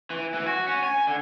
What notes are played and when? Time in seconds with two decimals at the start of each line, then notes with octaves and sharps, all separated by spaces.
0.10 E3
0.34 E3
0.47 F#4
0.67 C#4
0.84 G#5
1.07 D3